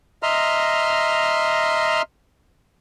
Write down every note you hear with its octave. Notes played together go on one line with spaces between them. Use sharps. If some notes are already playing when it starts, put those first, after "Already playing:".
D#5 E5 A#5 C6 F6